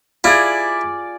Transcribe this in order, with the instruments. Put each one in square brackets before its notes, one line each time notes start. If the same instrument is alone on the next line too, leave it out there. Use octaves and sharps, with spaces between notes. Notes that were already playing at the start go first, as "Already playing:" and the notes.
[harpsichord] E4 [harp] F4 G#4 [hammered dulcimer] D5